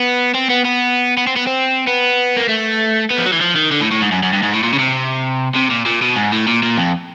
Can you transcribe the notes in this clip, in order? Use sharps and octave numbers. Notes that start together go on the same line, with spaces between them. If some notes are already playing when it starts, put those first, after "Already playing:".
Already playing: B3
C4
B3
B3
B3
C4
B3
C4
B3
A#3
A3
B3
F3
F#3
E3
F3
D#3
D3
A2
A2
G#2
F#2
F#2
G2
G#2
A2
A#2
C#3
C3
C3
A#2
A#2
B2
G#2
A2
A#2
A#2
F2